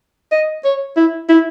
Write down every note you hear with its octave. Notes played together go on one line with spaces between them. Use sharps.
D#5
C#5
E4
E4